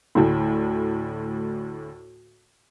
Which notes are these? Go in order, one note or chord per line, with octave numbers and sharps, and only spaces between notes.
D2 A2